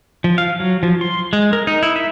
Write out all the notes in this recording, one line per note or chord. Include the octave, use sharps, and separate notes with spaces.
F3
F5
F#3
F3
C6
G#3
A#4
D#4
E4
E5